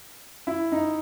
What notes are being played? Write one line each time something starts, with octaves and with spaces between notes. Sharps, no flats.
E4
D#4